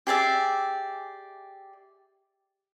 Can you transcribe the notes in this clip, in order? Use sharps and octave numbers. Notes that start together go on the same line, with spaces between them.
G4 G#4 D5 E5